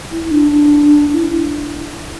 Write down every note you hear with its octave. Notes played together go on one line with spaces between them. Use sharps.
E4
D4
E4